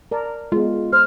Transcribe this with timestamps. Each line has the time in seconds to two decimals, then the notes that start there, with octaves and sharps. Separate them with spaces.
0.11 A#4 D5 A5
0.52 G#3 B3 F4
0.93 C5 F6